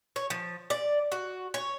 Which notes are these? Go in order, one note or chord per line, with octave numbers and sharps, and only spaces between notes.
C#5
F3
D5
F#4
C#5